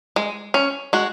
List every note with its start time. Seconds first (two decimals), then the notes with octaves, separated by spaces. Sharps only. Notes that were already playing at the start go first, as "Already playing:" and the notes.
0.16 G#3
0.54 C#4
0.93 G#3 F#4